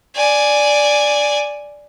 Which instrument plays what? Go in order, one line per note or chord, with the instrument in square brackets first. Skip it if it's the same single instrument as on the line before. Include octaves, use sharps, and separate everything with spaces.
[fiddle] D5 G#5